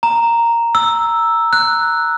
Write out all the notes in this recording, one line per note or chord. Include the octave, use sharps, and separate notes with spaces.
A#5
E6
F#6